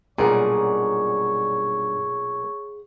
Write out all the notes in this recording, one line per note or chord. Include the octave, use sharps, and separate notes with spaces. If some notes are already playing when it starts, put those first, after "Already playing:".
B1 G2 A#2 G#4 C#5 F#5